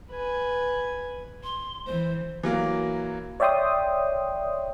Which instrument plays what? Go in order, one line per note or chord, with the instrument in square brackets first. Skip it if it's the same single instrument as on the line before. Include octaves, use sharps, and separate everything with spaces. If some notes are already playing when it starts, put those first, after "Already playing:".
[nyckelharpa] B4 G#5
[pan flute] C6
[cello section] E3 [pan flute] C5
[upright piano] E3 F#3 A#3
[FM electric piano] C#5 D5 E5 G5 C6 D#6